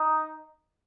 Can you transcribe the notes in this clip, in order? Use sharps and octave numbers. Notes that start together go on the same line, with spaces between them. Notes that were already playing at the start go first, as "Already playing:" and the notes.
Already playing: D#4